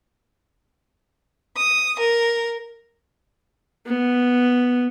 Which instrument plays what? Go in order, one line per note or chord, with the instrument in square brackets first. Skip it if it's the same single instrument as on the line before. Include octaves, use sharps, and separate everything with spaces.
[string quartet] D#6
A#4
[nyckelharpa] B3